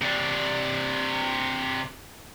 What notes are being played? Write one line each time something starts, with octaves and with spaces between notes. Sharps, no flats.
C3 D4